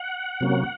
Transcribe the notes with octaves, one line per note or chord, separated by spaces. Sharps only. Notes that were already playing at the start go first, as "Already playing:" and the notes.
Already playing: F#5
C3 F#3 A#3 C#4